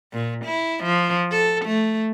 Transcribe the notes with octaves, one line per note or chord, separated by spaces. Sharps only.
A#2
E4
F3
A4
A3